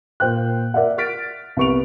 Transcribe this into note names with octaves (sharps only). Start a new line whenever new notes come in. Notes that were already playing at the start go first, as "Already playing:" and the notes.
A#2 C5 G5 F#6
A#4 D5 E5 F#5
F6 A6 B6 D7
C2 B3 C#6 D7 F7